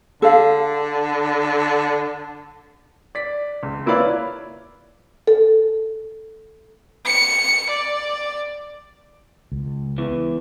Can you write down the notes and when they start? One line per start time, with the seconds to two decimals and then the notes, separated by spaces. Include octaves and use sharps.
0.22 D3 A4 F5
3.15 D5 B6
3.63 C#2
3.86 A#3 E4 B4 C#5 D5 F5
5.27 A4
7.05 C#7
7.70 D5
9.52 C#2
9.98 E2 E3